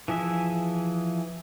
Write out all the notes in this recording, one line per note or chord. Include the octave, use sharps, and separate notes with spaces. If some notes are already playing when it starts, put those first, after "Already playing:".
E3 F3 G#4 E5